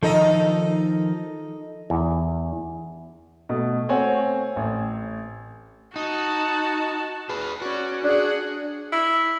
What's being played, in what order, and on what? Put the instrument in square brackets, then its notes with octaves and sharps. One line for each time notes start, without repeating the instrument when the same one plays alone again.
[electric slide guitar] D#3 F3 [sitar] D#4 A4
[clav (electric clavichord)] E2
[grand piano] B2 A3
A3 C4 C#5 F#5 G#5
A1
[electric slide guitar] D#4 [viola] F#4 A5
[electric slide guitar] G#4 B4
[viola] C#4 D5 [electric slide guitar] F#4
[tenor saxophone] D4 [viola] G#4 F#5
[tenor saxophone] E4